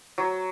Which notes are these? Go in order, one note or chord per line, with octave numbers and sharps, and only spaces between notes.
F#3